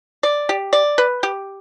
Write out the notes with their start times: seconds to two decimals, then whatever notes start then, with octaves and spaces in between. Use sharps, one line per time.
0.23 D5
0.49 G4
0.73 D5
0.98 B4
1.23 G4